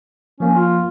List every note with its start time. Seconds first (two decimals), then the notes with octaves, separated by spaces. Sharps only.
0.40 F3 A#3 C#4
0.55 F4